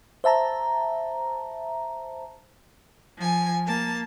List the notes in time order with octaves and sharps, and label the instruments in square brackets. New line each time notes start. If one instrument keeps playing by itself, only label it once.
[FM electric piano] C5 E5 A5 A#5
[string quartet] F3 G#5
A#3 A5